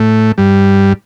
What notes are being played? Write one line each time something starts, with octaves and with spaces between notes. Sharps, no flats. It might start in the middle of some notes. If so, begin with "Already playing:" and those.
Already playing: A2 A3
G2 G3